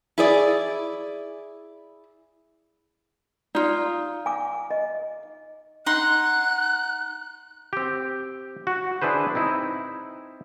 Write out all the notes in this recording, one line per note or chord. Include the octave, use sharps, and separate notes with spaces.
E4 G#4 D5
D#4 F4 D5
G#5 D6
D#5
D#4 F#5 C6 F#6
C4 G4
F#4
D4 E4 G#4 B4 C5
C4 D#4 E4